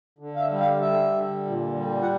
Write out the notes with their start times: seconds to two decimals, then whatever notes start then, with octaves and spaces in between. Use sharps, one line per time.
0.19 D3
0.36 F5
0.40 E5
0.50 G3
0.60 F5
0.81 G3 E5
1.13 D3
1.45 A#2
1.76 G3
2.02 F#5